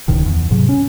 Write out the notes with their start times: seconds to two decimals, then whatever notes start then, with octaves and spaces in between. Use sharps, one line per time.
0.08 D1 C#2 A2 D#3
0.26 E2
0.51 G#2 C3 F#3
0.69 C#4